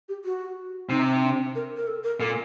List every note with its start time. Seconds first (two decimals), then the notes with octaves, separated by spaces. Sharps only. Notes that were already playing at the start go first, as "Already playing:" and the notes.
0.09 G4
0.25 F#4
0.89 C3 D#4
1.22 D4
1.55 A#4
1.77 A#4
1.87 A4
2.04 A#4
2.20 A#2 A4